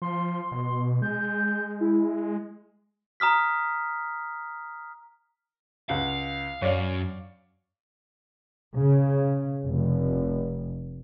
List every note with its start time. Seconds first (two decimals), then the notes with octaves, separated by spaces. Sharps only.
0.02 F3 C6
0.52 B2
1.02 G#3 G6
1.81 E4
3.20 A#5 D#6 F6 B6
5.89 C#2 F5 F#5
6.62 F#2 C#5 D5 F5
8.77 C#3
9.68 F1